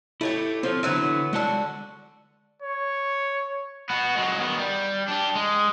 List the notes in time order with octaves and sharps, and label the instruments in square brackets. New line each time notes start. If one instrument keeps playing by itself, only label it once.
[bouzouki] A3 D4 G4 [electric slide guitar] E4 C#5
[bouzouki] F3 [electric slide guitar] C4 A4 C#5
[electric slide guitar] D3 E4 [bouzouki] E3 F#3 B3
[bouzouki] D3 F#4 [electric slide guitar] G#3 F#5 A5
[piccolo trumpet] C#5
[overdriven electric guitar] B3 F#4
F#3 G#3
D#3 B3
G3
D4 G4
G#3